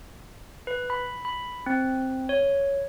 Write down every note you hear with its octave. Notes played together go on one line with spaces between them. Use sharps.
B4
B5
B5
C4
C#5